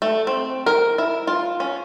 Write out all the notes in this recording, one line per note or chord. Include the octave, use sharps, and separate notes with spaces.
A3
C4
A#4
E4
F4
C#4